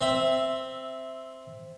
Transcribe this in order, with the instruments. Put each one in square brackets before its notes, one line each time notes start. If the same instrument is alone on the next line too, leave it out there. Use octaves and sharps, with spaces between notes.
[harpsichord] C4 E5